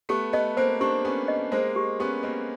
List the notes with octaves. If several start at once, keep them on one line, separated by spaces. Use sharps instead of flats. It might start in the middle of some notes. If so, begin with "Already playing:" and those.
A3 B3 G4
A3 B3 D#5
A#3 C4 C5
C4 D4 G4
B3 C#4 G4
D#5
G#3 A#3 C5
G4
B3 C#4 G4
A#3 C4 D#5